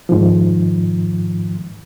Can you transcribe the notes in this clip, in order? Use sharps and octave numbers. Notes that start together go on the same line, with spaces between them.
F2 G#2 D#3 F3